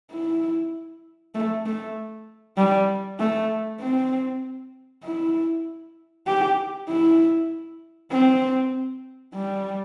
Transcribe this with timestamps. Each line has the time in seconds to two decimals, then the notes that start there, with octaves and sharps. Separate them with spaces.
0.12 E4
1.35 A3
1.66 A3
2.57 G3
3.19 A3
3.81 C4
5.04 E4
6.27 G4
6.88 E4
8.11 C4
9.34 G3